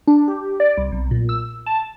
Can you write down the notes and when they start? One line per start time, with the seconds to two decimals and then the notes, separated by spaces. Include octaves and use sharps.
0.08 D4
0.28 G4
0.60 D5
0.77 C2
0.92 B1
1.11 A#2
1.29 E6
1.66 A5